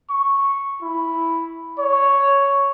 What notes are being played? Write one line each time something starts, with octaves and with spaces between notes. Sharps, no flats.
C#6
E4
C#5